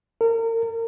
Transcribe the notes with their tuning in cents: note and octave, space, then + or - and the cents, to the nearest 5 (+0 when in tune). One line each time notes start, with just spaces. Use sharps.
A#4 -35